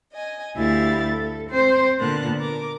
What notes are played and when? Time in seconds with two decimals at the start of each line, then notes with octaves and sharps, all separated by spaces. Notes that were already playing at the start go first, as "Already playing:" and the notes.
0.12 D#5 G#5
0.55 D2 E4 G4 E5 F5 A6
1.10 A4
1.50 C4 C5
1.99 A#2 D3 B3 A#4 A5 F#6
2.39 A#4 D6